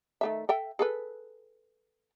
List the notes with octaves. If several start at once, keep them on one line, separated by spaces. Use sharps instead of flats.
D#3 A3 E5
A4 E5 G5
G#4 A4 B4